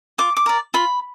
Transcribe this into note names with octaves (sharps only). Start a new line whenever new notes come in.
F4 D6
D6
A#4 D5
F4 B5